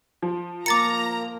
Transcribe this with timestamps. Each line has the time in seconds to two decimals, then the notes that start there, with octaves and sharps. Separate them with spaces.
0.22 F3
0.66 A#3 A#5 D6 A6 C#7